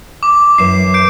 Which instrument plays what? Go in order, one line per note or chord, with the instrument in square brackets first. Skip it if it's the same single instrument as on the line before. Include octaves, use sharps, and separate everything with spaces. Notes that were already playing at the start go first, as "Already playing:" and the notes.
[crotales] D6
[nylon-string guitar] F#2 E3 [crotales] C7 E7
[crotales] G6 C7 D7